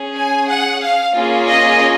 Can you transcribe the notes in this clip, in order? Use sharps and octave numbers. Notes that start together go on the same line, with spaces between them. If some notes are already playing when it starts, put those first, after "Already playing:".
Already playing: C#4 G#4
G#5
F#5
F5
A#3 C#4 F4 G#4
D#5